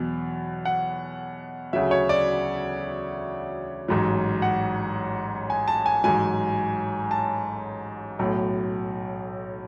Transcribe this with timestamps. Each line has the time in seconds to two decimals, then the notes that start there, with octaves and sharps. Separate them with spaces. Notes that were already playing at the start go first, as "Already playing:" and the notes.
Already playing: E2 B2 F#3
0.65 F#5
1.73 D2 C#3 F#3 E5
1.91 C#5
2.09 D5
3.88 A1 G#2 F#3
4.42 F#5
5.50 G#5
5.68 A5
5.86 G#5
6.04 A1 G#2 F#3 G#5
7.11 A5
8.19 B1 A2 F#3